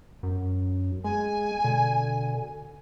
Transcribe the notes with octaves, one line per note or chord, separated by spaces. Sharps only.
F#2
G#3 G#5
B2 D3